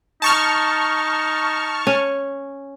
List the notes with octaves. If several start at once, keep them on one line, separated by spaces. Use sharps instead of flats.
D#4 A5 C#6 F6
C#4